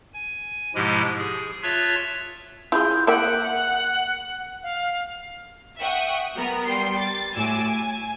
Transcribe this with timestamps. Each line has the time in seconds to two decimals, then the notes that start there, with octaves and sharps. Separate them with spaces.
0.14 G#5
0.75 G#2 B2 F3 G#3 E4 G4
1.18 G#4
1.63 F4 C#5 E5 A5 F#6
2.72 E4 F4 G#4 G6
3.07 A#3 E5 F#5 G5
4.63 F5
5.78 E5 F#5 G5 C#6 D#6
6.35 F#3 B3 A#4
6.65 G3 G5 C6 C7
6.98 A6
7.35 A2 F#4 G#5 D6 E6
7.66 G#5